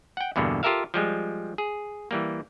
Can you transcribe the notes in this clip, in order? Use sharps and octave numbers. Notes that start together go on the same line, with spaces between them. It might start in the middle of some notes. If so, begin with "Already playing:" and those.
F#5 G5
E2 G2 B2 D3 A#3
F4 G4 A4 A#4 E5 F5
F3 G3 G#3
G#4
E3 G3 A#3